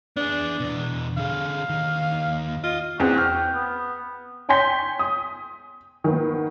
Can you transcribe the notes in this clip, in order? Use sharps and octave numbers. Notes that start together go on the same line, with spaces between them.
B3 D4 G#4
E2 B2
D3 G#4 F5
D#2 D#3
F4 D#5
E2 C4 F#4
G5 F6
B3
C#5 G5 G#5 C6 G6 B6
D#6
D#3 A#3 B3